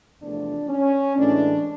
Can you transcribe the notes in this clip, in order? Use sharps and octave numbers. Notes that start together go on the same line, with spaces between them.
E2 C3 F3 A3 D4
C#4
A2 E3 G#3 D4